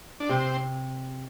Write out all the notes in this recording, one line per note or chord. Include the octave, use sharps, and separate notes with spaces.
D4
C3 C4